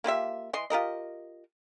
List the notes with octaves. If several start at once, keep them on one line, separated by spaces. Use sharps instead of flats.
A#3 F4 G4 E5
E3 D#5 C6
F4 G4 A#4 D#5